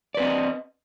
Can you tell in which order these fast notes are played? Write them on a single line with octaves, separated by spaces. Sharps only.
D5 B4 C4 D#5